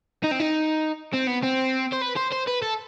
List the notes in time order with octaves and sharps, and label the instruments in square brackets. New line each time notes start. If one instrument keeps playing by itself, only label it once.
[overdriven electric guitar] D#4
C4
D#4
C4
B3
C4
C5
B4
C5
C5
B4
A4